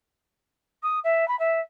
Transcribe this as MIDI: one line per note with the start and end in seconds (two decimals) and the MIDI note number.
0.83 0.99 87
1.04 1.27 76
1.28 1.38 83
1.39 1.60 76